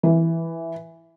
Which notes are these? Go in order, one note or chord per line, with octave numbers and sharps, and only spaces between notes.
E3